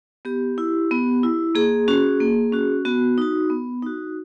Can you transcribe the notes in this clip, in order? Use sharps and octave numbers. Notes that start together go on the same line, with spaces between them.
B3 G4
E4
B3
E4
A#3 G#4
C#4 F#4
A#3
C#4 F#4
B3 F#4
D#4 F#4
B3
D#4 F#4